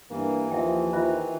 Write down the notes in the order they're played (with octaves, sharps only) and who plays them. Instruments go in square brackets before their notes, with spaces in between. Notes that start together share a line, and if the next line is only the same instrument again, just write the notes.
[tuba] G2 [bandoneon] E3 [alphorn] A#3
[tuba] D#2 [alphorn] F3 [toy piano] E5 G5
[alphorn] D#3 [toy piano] F4 C5 E5